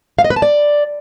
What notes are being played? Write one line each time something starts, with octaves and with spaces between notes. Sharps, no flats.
F5
D#5
B4
A5
D5